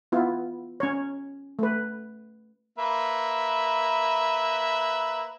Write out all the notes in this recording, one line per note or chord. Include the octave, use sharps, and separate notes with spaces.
B3 E4 F4
C#4 C#5
A3 B4
A#3 B4 E5